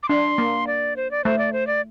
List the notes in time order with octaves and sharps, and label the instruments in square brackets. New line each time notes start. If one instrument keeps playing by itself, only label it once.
[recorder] D6
[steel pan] D4 [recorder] C6
[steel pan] A#3
[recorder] D5
C5
D5
[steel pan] A3 [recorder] C5
[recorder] D5
C5
D5